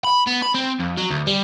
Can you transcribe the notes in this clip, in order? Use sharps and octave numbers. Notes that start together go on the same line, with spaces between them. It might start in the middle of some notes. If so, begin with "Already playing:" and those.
B5
B3
B5
C4
F2
F#3
D2
G3